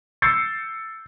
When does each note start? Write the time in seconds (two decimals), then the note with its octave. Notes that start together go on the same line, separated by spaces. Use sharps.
0.22 E6 G6 A6 C7 C#7